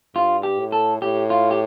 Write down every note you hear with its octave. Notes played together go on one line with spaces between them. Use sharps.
G2 F4
G4
A2
A4
A2 G4
F4
G4